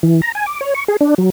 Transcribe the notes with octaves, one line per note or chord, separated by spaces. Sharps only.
E3
A#5
G#5
D6
C#5
C#6
G#4
D4
F#3